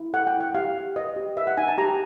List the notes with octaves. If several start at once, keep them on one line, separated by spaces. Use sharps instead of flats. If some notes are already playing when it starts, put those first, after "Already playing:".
Already playing: E4
A4 F#5
G5
E4
F#5
G4 F5
G4
B4 D#5
G4
B4 E5
F#5
D#4 G#5
A5
G4 A#5